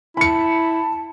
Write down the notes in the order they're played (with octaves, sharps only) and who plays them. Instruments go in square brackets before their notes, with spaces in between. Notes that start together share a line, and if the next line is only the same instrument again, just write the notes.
[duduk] E4 [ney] A5 [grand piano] B5 C#7